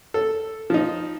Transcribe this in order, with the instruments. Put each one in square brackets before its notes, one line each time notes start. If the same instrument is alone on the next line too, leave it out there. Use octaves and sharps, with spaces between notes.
[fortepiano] A4
F3 D#4